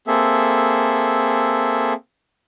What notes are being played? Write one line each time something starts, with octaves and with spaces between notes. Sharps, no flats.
A#3 C4 G#4 A4 E5